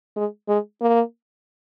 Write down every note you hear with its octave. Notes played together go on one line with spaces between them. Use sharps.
G#3
G#3
A#3